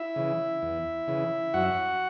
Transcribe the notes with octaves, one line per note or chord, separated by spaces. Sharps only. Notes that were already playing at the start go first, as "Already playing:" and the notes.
Already playing: E4 E5
C#3 E3
E2
C#3 E3
F#2 F#4 F#5